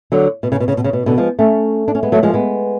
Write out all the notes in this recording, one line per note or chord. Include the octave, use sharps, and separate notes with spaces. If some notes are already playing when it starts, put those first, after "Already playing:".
D3 F#3
B2
C#3
B2
C#3
B2
C#3
B2
B2 D3
F3 G#3
A3 C#4
D4
C#4
G#3 B3
F#3 A3
F3 G#3
G#3 B3